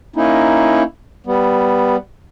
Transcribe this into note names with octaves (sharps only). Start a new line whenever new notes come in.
A#3 C#4 D#4 E4
G3 B3